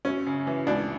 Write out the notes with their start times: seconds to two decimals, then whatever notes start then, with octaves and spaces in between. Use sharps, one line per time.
0.05 F#2 C#4
0.26 C#3
0.47 E3
0.67 C#2 D4